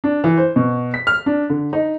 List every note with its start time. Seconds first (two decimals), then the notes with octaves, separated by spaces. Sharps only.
0.04 D4
0.24 E3
0.37 C5
0.56 B2
0.94 B6
1.07 F6
1.26 D4
1.50 D3
1.73 D#4